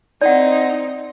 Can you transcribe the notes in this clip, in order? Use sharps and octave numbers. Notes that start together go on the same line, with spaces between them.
C4 D#4 D5 F#5